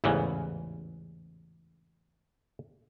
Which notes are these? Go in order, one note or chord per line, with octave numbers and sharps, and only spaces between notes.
A1 E2 G#2 C#3 E3